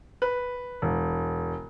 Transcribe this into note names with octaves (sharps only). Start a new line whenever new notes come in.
B4
E1